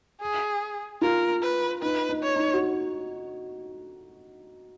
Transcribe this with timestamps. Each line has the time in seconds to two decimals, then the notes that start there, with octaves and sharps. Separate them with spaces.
0.21 G#4
1.01 F4 A#4
1.42 B4
1.82 D#4 B4
2.09 D#4
2.23 C#5
2.36 D#4
2.53 F#4